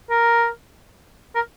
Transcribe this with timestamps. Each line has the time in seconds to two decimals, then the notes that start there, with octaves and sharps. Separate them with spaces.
0.10 A#4
1.35 A#4